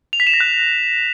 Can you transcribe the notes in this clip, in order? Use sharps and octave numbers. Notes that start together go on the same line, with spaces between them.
F7
B6
E7
A#6
F#6